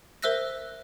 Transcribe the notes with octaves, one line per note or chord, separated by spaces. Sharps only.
A#4 C5 E5 E6 F#6 A#6